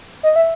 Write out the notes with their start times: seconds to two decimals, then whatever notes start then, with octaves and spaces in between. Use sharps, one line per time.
0.23 D#5
0.36 E5